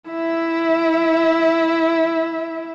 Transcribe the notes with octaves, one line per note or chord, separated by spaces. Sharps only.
E4 E5